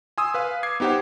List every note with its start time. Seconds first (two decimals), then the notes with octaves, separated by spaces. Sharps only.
0.18 G#5 C6 D#6 E6
0.34 B4 F5
0.63 D6 G#6 C7
0.80 B3 D#4 G4 C5 F#5